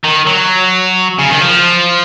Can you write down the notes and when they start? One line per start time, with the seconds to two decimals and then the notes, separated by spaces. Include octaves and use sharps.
0.04 D#3
0.27 F#3
1.19 C#3
1.29 D#3
1.41 F3